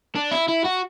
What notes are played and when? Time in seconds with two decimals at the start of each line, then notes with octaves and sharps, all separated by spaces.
0.15 D4
0.31 E4
0.49 E4
0.65 F#4